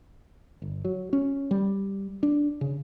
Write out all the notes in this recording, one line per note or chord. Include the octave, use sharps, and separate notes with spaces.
G1
F#3
C#4
G3
D4
C#3